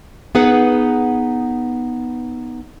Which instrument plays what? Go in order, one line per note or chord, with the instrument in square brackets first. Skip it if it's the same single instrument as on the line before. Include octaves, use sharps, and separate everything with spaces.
[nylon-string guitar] B3 D#4 G#4 B4 F#5